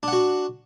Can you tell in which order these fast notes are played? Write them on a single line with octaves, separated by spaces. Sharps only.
D4 F#5 F#4